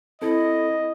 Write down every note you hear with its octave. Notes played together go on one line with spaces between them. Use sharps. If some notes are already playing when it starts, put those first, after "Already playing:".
C4 E4 A4 D#5